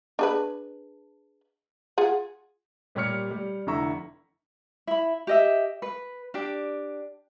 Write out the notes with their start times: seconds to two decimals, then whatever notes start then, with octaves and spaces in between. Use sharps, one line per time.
0.19 D4 G#4 B4
1.98 F4 G#4 F#5
2.95 A#2 G3 G4 C#5 F6 C#7
3.31 G3
3.67 F1 D3 E4 A#5 C#6 E6
4.87 E4 B5
5.27 G4 D#5 E5
5.82 B4
6.34 D4 G4